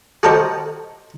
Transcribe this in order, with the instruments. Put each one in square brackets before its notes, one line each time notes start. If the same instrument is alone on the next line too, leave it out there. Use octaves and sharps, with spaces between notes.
[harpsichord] F#4 G4 A4 A#4 C5 D#5